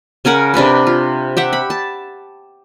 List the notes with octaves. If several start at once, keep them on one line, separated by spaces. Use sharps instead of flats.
C#3 C#4 A#4 F#5
C3 D4 A#4 B4
F4
G4 E5 F#5
B5
A5